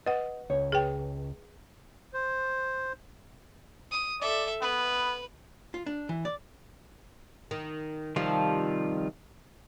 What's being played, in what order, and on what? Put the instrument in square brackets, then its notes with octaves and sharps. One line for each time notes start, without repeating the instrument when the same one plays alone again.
[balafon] B4 F#5 [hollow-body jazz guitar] D#5
[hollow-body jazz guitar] C#2 C#5
[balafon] G#4 B4 G5
[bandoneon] C5
[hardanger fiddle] D#6
[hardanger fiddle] A4 E5 [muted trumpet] D5
[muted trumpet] B3 [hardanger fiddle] B4
[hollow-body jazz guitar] F4
D4
E3
D5
[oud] D#3
[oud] C3 F3 [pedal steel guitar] D#3 G3 F4